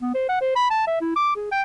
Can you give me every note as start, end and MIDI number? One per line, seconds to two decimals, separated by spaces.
0.02 0.12 59
0.14 0.27 72
0.29 0.39 78
0.41 0.54 72
0.56 0.66 83
0.70 0.86 81
0.87 1.00 76
1.01 1.12 64
1.16 1.34 86
1.36 1.51 68
1.52 1.62 79